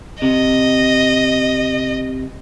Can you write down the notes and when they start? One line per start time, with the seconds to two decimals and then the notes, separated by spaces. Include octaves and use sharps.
0.22 C3 D#5